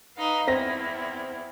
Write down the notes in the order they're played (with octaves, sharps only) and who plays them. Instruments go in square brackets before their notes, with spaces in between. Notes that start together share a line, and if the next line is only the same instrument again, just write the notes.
[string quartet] D#4 B4 F5
[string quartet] E2 E4 [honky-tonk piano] C4 A#6